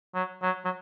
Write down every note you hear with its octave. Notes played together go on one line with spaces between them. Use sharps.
F#3
F#3
F#3